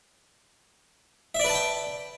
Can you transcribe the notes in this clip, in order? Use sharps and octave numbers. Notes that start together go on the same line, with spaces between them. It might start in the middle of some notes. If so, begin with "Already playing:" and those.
B4 D5 E5 G5 A5